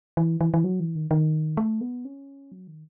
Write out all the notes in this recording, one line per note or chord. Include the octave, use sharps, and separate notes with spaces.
E3
E3
E3
F#3
E3
D#3
D#3
A3
B3
C#4
F#3
D#3